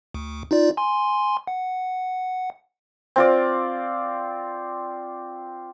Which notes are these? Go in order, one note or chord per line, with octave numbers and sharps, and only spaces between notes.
D2
D#4 F4 D5
G#5 C6
F#5
C4 F4 D5